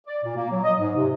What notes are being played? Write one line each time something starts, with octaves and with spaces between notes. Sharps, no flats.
D5
A#2
A#3
F#3
D#5
G#2
C3